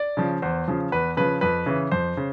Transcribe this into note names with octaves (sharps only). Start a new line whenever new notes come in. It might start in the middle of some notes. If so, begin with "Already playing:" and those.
Already playing: D5
C#3 F3
E2 C5
C#3 F3
E2 B4
C#3 F3 B4
F2 B4
C#3 E3
F2 C5
C#3